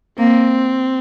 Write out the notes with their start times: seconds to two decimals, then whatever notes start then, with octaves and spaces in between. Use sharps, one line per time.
0.18 A#3 C4